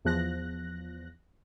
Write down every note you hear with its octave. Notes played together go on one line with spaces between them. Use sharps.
E2 F3 F#6 A#6